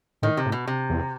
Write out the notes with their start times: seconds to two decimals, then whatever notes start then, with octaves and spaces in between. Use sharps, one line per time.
0.22 A2 D#3
0.37 C3
0.46 A2
0.52 B2
0.67 C3
0.89 E2